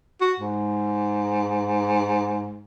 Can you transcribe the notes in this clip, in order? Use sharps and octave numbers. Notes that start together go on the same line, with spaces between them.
F#4
G#2